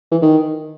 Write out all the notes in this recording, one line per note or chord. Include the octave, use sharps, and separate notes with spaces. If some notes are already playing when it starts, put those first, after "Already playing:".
E3
D#3